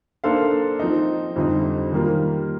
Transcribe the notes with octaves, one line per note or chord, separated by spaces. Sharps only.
A#3 D4 A4 C5 F5
F3 C4 D#4
F2 D3 G3 C4 D#4
D#3 G3 A#3 F4